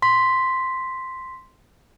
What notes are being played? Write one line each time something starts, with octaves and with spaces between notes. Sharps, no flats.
C6 B6